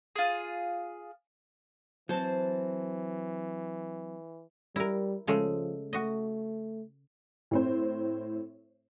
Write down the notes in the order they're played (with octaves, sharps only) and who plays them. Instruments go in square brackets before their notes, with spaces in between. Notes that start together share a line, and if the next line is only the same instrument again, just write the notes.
[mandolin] F4 G#4
[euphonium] E3 [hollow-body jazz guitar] F#3 C4 [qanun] C5 A5
[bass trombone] G3 [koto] E4 A#4
[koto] C#3 G#3 A3 [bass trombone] F3
[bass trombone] A3 [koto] F#4 D#5
[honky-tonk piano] A2 C4 C5